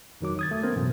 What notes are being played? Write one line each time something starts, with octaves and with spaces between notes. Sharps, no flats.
F2 D#3 F#3 D6
D#6 G#6 A6
A3
A#3 B3 C#4 A#4 C5
A1 F#2 B2